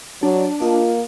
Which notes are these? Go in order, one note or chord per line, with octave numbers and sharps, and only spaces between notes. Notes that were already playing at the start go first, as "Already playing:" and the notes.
F#3 D4
A#3 F4 D#5